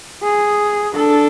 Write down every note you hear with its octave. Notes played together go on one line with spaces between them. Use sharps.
G#4
D4 A4